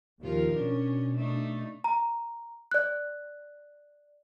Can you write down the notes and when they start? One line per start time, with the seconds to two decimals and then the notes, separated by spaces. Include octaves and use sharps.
0.22 D#2 F3 F4 A#4
0.55 B2 C#4 D4
1.16 A3 D4 D#4
1.84 A#5
2.71 D5 F#6